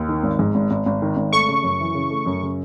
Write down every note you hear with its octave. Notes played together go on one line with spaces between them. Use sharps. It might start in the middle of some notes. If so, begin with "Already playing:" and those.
Already playing: D#2
D#3
G#1
G#2
G#1
G#1
G#1
D#3
G#1
A3 C#6
C#3
F#2
E3
C#3
A3
F#2
C#3